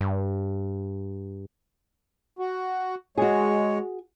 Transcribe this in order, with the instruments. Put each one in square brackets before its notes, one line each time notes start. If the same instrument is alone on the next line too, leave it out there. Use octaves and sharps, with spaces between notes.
[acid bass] G2
[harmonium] F#4
[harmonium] G#3 C#5 [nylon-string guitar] F#4 G#4